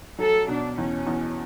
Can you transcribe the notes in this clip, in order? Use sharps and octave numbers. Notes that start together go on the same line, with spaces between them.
F#3 A4
B2 D4
E2 C#4
E2